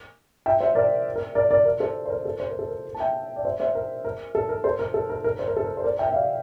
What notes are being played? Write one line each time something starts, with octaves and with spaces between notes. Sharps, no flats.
E5 G5
C5 E5
A#4 D5
A#4
A#4 D5
A#4 D5
A#4
A4 C5
C5
A#4
A4
C5
A#4
A4
A#4
A5
E5 G5
D5
C5 E5
C5 E5
A#4
A#4
A4
A#4
A4 C5
A#4
A4
A#4
A#4
C5
A#4
A4
A#4
C5
A#4 D5
E5 G5
E5
D5 F5